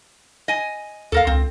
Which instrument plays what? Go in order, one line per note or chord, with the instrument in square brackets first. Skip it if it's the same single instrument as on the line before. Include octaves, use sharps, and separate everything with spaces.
[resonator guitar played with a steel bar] D#5 G#5
[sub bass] D#2 [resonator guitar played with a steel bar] A4 A#4 F5
[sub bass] C#2 [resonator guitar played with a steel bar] C4